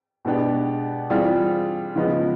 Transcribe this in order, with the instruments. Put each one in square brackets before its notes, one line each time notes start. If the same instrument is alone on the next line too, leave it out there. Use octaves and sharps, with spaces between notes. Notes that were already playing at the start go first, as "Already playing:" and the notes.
[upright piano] B2 G#3 B3 D4 G4
E3 G3 C4 F4 G#4
C#3 F3 G#3 B3 D#4